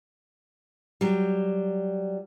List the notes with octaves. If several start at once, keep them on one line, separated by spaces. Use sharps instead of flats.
F#3 G3